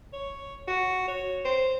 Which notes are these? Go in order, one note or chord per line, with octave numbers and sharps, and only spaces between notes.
C#5
F#4
C#5
C5